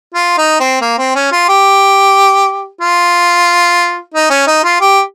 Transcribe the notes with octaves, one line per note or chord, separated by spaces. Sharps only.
F4
D#4
C4
A#3
C4
C#4
F4
G4
F4
D#4
C#4
D#4
F4
G4